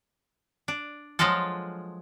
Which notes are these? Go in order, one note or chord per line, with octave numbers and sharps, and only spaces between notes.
D4
F3 F#3 G#3 F4 A4